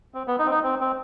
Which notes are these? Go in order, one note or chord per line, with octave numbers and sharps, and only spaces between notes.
C4
B3
D#4
C4
D#4
C4
C4